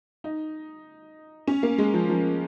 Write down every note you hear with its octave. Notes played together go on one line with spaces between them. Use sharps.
D#4
C#4
A#3
G#3
F3
F3